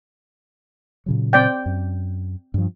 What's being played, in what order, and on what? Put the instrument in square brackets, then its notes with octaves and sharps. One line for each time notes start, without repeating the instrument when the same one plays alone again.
[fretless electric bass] A#2 C#3 F#3
[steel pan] C4 D5 G5
[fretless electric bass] F#2
G2 F3